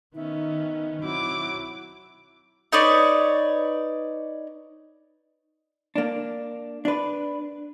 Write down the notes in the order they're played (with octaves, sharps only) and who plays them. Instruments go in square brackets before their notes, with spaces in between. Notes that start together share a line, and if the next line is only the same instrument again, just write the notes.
[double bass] D#3 [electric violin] B3 C#4 [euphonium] D#4 [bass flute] E5
[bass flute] F#3 [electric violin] C4 D6 [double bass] E4
[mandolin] D#4 B4 C#5 D5
[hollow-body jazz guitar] A#3 D4
D4 B4